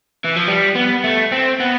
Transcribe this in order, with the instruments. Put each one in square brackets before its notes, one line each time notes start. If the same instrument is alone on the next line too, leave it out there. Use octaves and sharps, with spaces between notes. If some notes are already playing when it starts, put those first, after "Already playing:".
[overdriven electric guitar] E3
F3
G3
B3
A3
C4
B3